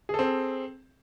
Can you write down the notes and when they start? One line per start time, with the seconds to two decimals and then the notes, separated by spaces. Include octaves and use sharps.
0.09 G#4
0.14 A4
0.19 C4